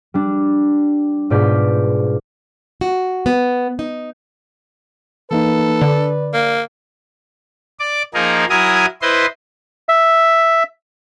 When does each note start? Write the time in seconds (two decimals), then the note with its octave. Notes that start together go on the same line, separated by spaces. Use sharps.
0.14 G3 D4
1.30 G#2 B2 F4 D5 G6 B6
2.81 F#4
3.26 B3
3.79 D#4
5.31 E3 A#3 D#4 A4 B4
5.82 D3 D5
6.34 A#3
7.80 D5 D6
8.14 F3 A#3 D#4 G#4 A#4
8.50 F#3 E4 A#4 G#5 D#6
9.02 E4 B4 C5 D#5 C6
9.89 E5